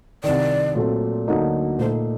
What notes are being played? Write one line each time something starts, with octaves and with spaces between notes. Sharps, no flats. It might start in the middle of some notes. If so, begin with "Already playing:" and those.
C2 C3 D#3 D5
A#2 F#3 A3 C4
D2 D3 F#3 A#3 D#4
A#2 A3 D#4 C5